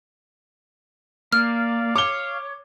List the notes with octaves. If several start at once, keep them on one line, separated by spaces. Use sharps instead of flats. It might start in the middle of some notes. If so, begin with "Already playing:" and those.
A#3 D5 F5 F6
C#5 F5 D6 G7